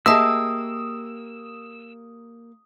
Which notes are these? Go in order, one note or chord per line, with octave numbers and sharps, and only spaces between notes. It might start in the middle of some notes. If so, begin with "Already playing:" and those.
A#3 G4 G#4 D#5 E5 A5 D#6 E6